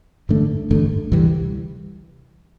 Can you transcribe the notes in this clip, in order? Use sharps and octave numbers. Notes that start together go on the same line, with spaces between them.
A1 G2 D3 A3
A1 G2 D3 A3
D2 C3 E3 G3